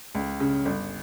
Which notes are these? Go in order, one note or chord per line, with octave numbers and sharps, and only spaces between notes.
C#2
C#3
G1